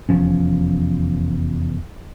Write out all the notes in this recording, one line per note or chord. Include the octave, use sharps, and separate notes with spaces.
F1 E2 F3 C#4